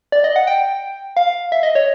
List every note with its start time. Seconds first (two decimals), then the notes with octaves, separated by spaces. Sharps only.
0.12 D5
0.24 D#5
0.36 F#5
0.47 G5
1.17 F5
1.52 E5
1.63 D#5
1.75 C#5